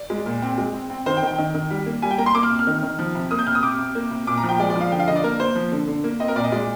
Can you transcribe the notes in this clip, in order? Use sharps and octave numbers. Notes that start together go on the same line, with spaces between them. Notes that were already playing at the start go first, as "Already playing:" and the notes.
Already playing: D5
G#3
A#2
C4
G#3
C4
C4
D#3 C5
G5
D#3
G5
D#3
D#3
G3
A#3
G3 G#5
G5
A#3 A#5
C6
A#3 D6
F6
C3
F6
D#3
D#3
F3
C3
A#3 D#6
G6
C3 F6
D#6
C3 D6
C3
A#3
C3
A#2 D6
A#5
F3
G5
G#3 D5
D5
F3
F5
D3 G5
F5
D3 D#5
D5
A#3 A#4
A#3 C5
F3
D3
D3
A#3
C4 D#5
A#4
A#2 D5
D#5
G#3 D5